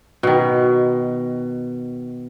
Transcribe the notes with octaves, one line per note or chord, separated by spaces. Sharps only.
B2 D#3